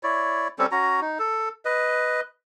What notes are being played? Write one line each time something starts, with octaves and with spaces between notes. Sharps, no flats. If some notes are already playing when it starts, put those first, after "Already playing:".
E4 C#5 D5
G3 C4 C#4 A4
C#4 F#4 A#5
D#4
A4
B4 D#5